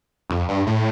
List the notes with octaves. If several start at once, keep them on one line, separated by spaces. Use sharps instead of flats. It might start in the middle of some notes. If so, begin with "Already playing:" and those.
F2
G2
A2